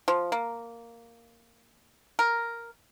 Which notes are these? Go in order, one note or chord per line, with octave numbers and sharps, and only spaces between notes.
F3
A#3
A#4